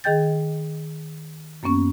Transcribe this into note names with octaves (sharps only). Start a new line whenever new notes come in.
D#3 G#4 D#5 G5 G6 A6
F#2 A#3 B3 C#4 C#6